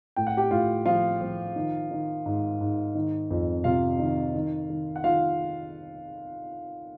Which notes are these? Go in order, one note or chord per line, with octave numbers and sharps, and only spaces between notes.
A2 G5
F#5
G4 G5
A2 F4 F5
F3 F4 F5
F3
D#3
D#3
G#2
G#2
D#3
F2
C3 F4 F5
D#3
D#3
D#3
F#5
D#3 F4 F5